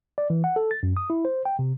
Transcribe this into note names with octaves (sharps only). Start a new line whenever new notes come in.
D5
E3
F#5
A4
A6
F#2
D#6
E4
C5
G5
C3